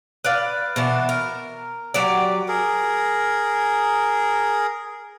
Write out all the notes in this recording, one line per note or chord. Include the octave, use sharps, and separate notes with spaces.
B4 D5 F5
B2 E3 D4
A#4
F#3 G4 D5
G#4 A#4